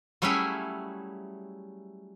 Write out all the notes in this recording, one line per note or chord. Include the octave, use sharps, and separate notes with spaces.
F#3 G3 A3 C#4 E4 G#4